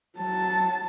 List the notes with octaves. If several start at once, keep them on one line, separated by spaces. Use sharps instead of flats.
F#3 A5